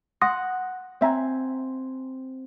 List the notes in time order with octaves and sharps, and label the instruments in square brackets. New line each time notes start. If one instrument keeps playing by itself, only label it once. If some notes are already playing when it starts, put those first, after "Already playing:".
[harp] F#5 [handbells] C6 D#6 A#6
[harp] C4 G#5 [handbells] C#5 E5 A#5